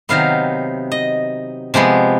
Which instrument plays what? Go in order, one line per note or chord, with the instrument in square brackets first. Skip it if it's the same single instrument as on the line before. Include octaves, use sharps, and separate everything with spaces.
[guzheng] C3 D#3 F#3 B3 F5
D#5
C3 F3 G#3 B3